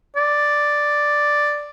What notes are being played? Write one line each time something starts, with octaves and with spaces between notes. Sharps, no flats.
D5